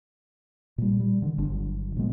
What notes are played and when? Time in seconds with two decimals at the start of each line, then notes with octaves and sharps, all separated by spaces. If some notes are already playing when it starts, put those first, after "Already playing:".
0.78 A#2 G3
1.00 G3
1.22 D3 D#3
1.38 G1 D3 F#3 D4
1.96 A#2 F3 G#3 B3